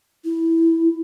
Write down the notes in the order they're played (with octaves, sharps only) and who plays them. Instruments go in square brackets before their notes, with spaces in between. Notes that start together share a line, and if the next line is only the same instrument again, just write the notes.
[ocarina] E4